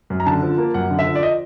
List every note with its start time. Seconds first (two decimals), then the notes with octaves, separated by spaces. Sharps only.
0.10 F#2
0.20 A#5
0.26 D3 A5
0.43 F3
0.58 A#3
0.74 F#2 F#5
0.91 D3
0.99 E5
1.07 F3
1.15 D5
1.23 D#5